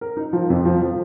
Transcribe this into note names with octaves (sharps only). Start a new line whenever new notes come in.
A#4
D#4
F3
F2
F3
F3